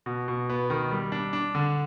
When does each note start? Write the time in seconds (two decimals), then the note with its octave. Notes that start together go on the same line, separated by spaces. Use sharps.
0.06 B2
0.28 B2
0.50 B3
0.70 D#3
0.91 G3
1.12 D4
1.33 D4
1.55 D3